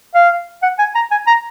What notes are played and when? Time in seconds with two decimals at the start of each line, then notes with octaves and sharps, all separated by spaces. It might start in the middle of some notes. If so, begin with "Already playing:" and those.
0.15 F5
0.63 F#5
0.79 G#5
0.95 A#5
1.12 G#5
1.27 A#5